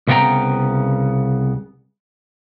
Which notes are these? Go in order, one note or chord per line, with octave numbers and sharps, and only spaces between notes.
C2 C#3 B3 A#4 G5 A#5